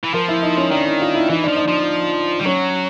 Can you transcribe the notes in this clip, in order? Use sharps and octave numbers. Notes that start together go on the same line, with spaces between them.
E3
F3 A#4
E4
D#4
C#4
D#3 D4
E4
F4
E4
E3 D#4
F3 D4
D#4
F3
G3
F#3 C#4